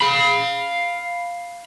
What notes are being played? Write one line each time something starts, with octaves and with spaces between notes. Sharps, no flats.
F5 B5